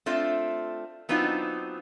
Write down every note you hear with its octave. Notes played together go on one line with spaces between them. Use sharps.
A3 C4 D4 F4
F#3 B3 C4 D4 D#4 F4